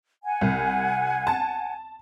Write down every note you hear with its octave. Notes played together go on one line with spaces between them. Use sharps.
F#5 G#5
C2
A5